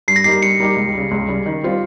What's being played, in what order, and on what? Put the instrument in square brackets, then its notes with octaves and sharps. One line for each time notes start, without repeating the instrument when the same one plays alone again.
[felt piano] G2 [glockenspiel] C7
[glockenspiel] A#6
[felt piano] G3 A#3 D#4 G4 [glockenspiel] C7
[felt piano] G2 [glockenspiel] C#7
[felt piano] G3 A#3 D#4 G4
C#2
C#3 G3
C#2
C#3 G3
D#3
G3 C4 F4